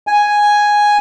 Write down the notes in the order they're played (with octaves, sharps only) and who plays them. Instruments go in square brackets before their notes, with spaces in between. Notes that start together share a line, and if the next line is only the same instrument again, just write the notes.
[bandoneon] G#5